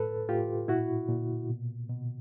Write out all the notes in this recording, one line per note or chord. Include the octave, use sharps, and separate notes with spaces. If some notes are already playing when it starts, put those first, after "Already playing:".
Already playing: A2 A4 B4
A2 F4 G4
A#2 E4 F#4
A#2
B2
B2